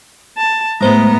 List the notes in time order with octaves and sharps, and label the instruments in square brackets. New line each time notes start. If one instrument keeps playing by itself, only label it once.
[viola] A5
[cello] A2 B3 [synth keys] G#3 C5 [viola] A#5